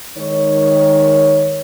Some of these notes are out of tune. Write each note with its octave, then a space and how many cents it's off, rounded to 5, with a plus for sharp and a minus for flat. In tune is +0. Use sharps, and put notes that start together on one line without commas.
D#3 +0 G#3 +0 C#5 +0